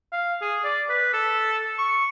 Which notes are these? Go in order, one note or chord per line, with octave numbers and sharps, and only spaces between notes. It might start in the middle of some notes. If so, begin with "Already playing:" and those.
F5
G#4
D5
B4
A4
C#6